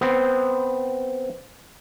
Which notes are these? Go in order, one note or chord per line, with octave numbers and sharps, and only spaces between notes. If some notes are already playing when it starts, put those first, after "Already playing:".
B3 C4